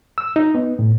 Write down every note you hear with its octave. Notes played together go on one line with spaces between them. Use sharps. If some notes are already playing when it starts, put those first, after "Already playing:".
E6
D#4
B3
A2